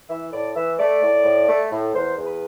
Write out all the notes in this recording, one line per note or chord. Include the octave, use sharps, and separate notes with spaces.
E3 E5
A2 D5
E3 E5
A3 D5
A2
A2
A3
A2
E2 C5
E2
B4